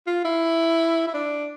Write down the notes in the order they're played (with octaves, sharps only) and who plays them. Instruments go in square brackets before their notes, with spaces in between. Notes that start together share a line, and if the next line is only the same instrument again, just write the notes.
[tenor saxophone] F4
E4
E4
D4